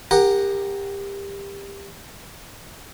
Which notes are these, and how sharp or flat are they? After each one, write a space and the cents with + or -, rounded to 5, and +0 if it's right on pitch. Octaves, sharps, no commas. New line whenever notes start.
G4 +25 A#4 +0 F#5 +0